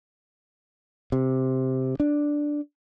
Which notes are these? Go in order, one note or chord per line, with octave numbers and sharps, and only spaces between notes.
C3
D4